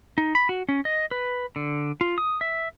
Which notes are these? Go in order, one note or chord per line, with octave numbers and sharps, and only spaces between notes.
D#4
B5
F#4
C#4
D#5
B4
D3
F4
D#6
E5